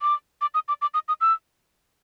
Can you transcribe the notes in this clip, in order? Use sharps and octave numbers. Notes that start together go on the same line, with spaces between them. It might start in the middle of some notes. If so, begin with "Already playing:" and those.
D6
D6
D#6
D6
D6
D#6
D#6
E6